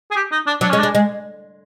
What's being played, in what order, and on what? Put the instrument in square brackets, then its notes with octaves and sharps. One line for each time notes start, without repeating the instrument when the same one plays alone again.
[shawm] G#4
G4
D#4
D4
[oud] F#3 [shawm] D4
[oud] G#3 [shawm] C#4
[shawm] D4
[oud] G#3
G#3